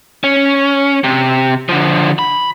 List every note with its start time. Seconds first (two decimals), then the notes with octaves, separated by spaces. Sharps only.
0.24 C#4
1.04 C3
1.69 D3 F3
2.19 B5